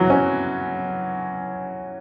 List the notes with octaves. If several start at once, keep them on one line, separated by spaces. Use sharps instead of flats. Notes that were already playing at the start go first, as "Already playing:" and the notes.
Already playing: E3 F#3
C#4